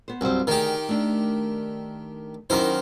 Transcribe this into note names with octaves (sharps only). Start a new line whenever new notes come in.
B3 C5
C2 G2 F#3 C5
D2 D#3 G4 G#4
A3 D4
F#2 D#3 E4 C5